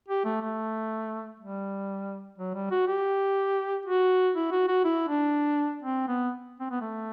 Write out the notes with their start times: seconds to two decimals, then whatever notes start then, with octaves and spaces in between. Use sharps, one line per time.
0.08 G4
0.25 A3
0.41 A3
1.40 G3
2.38 F#3
2.54 G3
2.71 F#4
2.87 G4
3.86 F#4
4.35 E4
4.51 F#4
4.68 F#4
4.85 E4
5.09 D4
5.83 C4
6.08 B3
6.60 C4
6.70 B3
6.81 A3